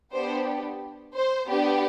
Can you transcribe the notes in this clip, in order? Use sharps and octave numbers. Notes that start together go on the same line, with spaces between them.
B3 D4 G4 C5
C5
B3 D4 G4